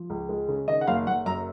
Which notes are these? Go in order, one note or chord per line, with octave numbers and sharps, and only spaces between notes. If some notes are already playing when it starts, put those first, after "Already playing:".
Already playing: F3
C#2
G#3
C#3
D#3 D#5
F#5
F#1 F5
F#1 F#5
F#2 A#5